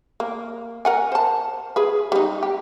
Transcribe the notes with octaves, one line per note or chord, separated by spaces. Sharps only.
A#3
A#4 F#5 G#5
C5 A5
G#4 B4
G3 D#4
G4